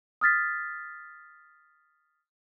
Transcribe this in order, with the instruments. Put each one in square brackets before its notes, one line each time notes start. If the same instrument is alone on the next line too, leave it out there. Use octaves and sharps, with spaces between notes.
[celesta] D#6 F6 A6 B6